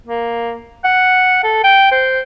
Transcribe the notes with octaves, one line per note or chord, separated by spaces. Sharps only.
A#3
F#5
A4
G5
C5